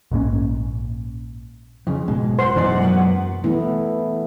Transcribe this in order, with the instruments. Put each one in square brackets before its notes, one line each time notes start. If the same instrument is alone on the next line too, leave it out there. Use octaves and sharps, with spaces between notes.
[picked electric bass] A#1 G#2 A#3 C#4
[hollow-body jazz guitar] F2 C#3
[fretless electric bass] F#1 G#2 G#3 [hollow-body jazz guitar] B2
[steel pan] C5 C6 [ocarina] F#5
[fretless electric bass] F#2 B2 G#3 [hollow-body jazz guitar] E3 D#4 D5
[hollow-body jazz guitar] F#3 A#3 B3
[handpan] E3 A3 B3 E4